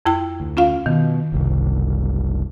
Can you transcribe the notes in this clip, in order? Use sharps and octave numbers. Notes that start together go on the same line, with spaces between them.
F2 E4 G5
D2
C#4 F4 F5
B2 D#3
F#1 C2